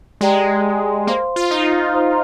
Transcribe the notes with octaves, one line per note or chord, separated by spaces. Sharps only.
G#3 G4 D5 G5 A#5
A#3 C5 F5 C6
F4
D#4
C5 F5 A#5